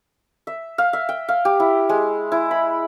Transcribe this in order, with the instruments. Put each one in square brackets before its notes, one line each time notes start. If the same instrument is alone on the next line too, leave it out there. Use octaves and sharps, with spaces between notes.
[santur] E5
F5
E5
G5
F5
G4
E4
G#3
E4
B5